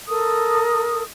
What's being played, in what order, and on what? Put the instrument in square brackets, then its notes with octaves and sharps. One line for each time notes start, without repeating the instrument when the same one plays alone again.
[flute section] A4 A#4 D#6